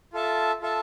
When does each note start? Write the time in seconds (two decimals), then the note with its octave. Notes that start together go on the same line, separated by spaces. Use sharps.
0.13 F4 A4 E5 A5
0.62 F4 A4 E5 A5